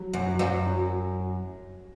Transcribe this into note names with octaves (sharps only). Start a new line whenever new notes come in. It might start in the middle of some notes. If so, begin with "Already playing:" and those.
Already playing: F#3
F#2
F#3
F#2
F#3